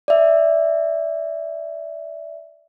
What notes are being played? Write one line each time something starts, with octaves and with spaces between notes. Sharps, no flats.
D5 E5